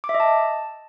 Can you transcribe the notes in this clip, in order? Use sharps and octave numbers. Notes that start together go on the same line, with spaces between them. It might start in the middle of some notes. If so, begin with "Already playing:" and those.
D6
E5
D#5
A5